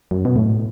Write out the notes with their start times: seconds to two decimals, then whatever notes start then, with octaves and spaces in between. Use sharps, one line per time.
0.11 F#2
0.25 B2
0.36 A2